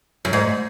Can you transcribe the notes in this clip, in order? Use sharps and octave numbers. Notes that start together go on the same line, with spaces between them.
F#2
G#2